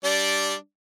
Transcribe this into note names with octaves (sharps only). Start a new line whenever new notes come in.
G3 D4 D5